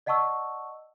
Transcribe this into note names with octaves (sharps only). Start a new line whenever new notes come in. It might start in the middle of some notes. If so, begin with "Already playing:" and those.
D5 D#5 F#5 A5 C#6 E6